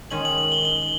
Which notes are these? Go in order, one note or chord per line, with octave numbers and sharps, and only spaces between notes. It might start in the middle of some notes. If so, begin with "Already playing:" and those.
D#3 G#3 C#4 F#7
F#7
F#7
G7
G7